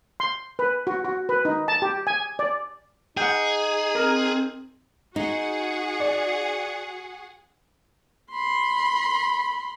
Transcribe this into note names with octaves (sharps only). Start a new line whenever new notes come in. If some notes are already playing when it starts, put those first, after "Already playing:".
C6
B4
F#4
F#4
B4
D#4
A5
G4
G#5
D5
D#4 G#4 F#5 G5
C4 A#4
D#4 F#4 G#4 F#5
D5
B5 C6